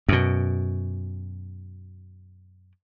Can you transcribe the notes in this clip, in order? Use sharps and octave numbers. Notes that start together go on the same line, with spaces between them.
F#2 B2